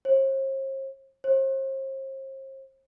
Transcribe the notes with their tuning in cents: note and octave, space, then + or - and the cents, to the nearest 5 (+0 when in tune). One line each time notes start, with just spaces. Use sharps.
C5 +45
C5 +40